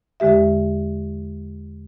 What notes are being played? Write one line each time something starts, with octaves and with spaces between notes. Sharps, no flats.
E2 D3 G#3 G4 E5